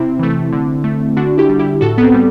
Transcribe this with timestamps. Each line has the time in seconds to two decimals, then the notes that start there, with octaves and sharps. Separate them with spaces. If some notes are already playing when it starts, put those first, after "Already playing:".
Already playing: C3 C4 E4
0.19 E3 A3
0.53 D3
0.84 A3
1.17 D3 D4 F#4
1.38 E4 G4
1.49 G3
1.59 E4 G4
1.81 A2 F#4 A4
1.98 B3
2.03 C4
2.14 G3